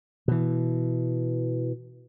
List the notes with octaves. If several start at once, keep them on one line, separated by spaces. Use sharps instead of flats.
B2 E3